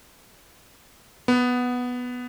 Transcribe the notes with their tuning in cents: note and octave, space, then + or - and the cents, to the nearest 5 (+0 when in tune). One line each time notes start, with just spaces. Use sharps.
B3 +0